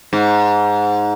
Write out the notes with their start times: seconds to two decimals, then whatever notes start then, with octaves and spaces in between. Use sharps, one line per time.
0.13 G#2